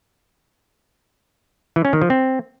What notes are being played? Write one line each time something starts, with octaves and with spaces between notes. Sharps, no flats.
E3
C#4
D#3
F3
C4